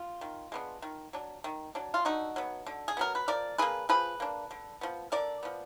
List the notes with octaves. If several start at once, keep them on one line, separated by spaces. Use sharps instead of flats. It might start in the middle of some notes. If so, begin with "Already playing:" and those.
Already playing: F4
D#3
G#3 B3 D4
D#3
F#3 D4
D#3
F#3 D4
F4
D3 D#4 F#4
F#3 B3
D3
G#4
F#3 B3 A#4
B4
F3 A#4 D5
A#3 D4 G#4 B4
F3 G#4 B4
A#3 D4
D3
F3 B3
D3 A#4 D5
F3 B3